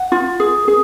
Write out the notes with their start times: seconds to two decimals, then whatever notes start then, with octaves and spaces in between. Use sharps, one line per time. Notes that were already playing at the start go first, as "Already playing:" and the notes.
Already playing: F#5
0.12 F4
0.40 G#4
0.68 G#4